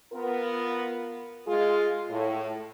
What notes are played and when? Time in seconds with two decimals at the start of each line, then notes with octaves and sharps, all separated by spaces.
0.13 B3 F4 A#4
1.47 G#3 F4 G#4
2.09 A2